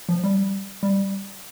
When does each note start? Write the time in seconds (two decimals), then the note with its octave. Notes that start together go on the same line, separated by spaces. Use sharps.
0.09 F3
0.24 G3
0.83 G3